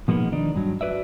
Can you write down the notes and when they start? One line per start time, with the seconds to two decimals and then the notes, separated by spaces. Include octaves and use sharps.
0.08 B2 F3 G#3 A#3 B3 D#4
0.32 D#3 D4 D#4
0.56 G2 F#3
0.81 F#4 B4 D5 E5